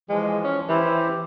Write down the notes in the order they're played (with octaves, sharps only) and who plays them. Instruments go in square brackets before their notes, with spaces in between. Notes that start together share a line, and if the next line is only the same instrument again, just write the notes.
[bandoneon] E3 F3 [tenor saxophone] G#3
[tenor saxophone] C#4
[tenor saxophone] E3 [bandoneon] E4 G4 C5